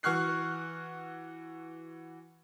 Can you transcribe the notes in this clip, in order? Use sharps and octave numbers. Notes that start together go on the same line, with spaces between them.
E3 F#4 C#6 F6 F#6 C7